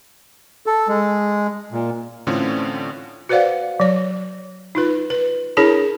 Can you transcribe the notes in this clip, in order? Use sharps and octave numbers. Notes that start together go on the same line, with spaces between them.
A4
G#3
A#2
A2 D3 E3 C4 C#4 F4
F#4 B4 C5 D5 F5 F#5
F#3 C#5
D#4 F4 B4
B4
D4 E4 G#4 A#4 C#5 A5